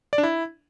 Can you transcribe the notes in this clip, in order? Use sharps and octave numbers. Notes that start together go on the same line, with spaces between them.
D5
D4
E4